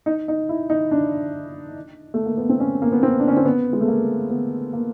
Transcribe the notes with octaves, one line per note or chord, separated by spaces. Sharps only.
D#4
D#4
E4
D#4
D4
A3
A#3
B3
C4
C#4
A#3
B3
C4
D4
C#4
C4
B3
G#3
A3
A#3
B3
A#3